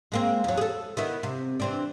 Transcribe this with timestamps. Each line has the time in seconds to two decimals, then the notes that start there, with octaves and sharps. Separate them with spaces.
0.12 G#3 A#3 C4
0.44 E2 F#3
0.57 G#4 A4
0.97 D#3 B3 E4
1.23 C3
1.60 E3 C4 D4